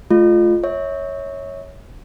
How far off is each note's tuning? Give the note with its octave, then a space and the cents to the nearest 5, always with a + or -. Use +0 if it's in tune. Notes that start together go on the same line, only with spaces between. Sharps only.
A3 -40 F4 +0
C#5 +0 E5 -35